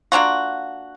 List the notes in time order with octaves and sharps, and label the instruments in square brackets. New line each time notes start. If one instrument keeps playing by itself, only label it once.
[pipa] A#3 D4 F4 F#4